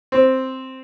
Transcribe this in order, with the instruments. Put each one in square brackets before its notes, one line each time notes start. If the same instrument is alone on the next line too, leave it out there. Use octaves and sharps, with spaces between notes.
[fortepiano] C4